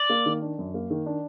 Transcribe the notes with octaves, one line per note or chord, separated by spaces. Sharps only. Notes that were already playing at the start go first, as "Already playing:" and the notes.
Already playing: D5
A#3
D#3
D4
F#2
A#3
D#3
D4